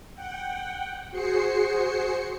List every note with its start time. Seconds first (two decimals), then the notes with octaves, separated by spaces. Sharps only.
0.15 F#5 G5
1.11 F#4 G#4 C5 C7 C#7